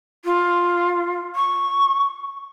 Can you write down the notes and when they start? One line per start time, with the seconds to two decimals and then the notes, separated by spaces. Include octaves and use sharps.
0.24 F4
1.35 C#6